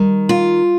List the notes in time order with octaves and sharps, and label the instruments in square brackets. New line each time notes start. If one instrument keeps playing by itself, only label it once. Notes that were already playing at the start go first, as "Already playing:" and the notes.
Already playing: [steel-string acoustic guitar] D#3 [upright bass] G3
[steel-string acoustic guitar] F4